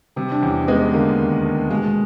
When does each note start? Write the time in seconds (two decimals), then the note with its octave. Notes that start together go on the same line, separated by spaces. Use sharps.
0.16 C3 G3
0.32 D4
0.42 E2 C#4
0.68 G#3 B3
0.93 D3 A#3
1.19 D#2
1.44 A3
1.70 B2 G#3